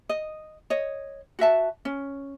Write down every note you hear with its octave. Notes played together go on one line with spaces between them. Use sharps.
D#5
C#5 D#5
F#4 B4 E5 A5
C#4